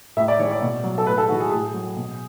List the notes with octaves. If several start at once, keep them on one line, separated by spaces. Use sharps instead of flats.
A2 E5
D5
E3 G#3 C#5
D5
B2
F#3
A4
A2 B4
A4
E3 G#3 F#4
G#4
A2 G#4
F#3
B2